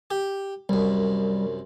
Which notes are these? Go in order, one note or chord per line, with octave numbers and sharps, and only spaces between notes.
G4
C2 F#2 G3